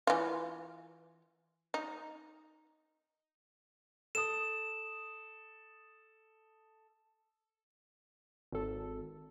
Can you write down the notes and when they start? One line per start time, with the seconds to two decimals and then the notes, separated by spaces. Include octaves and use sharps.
0.07 E3 F4
1.74 D#4
4.15 A4 D#6 E7
8.52 G#1 A4